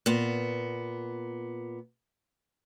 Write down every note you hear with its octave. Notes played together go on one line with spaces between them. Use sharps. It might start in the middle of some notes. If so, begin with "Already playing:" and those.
A#2 B3